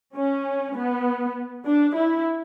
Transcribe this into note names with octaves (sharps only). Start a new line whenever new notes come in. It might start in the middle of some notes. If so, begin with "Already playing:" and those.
C#4
B3
D4
E4